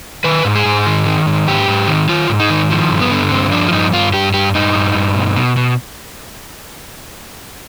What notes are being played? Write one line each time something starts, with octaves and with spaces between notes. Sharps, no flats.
D#3 B4
G#2
G#4
G#2
D#3
D#3
G#2
G#2 G4
G#2
D#3
D#3 F4
G#2
D#4
D#3
F3
G2
B3
D3
G2 C4
F3 D4
F4
G2 D#4
G2 F4
G2 G4
G2 G4
G2 D#4
G2
G2
B2
B2
B2